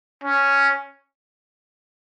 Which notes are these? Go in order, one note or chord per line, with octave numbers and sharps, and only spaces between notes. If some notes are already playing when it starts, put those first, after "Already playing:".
C#4